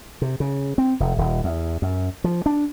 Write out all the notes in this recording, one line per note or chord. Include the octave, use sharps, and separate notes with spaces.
C3
C#3
C4
F1
D#1
E2
F#2
F3
D4